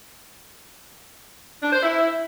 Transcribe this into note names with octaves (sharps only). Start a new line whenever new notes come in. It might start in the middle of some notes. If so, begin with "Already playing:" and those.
D4
C5
E4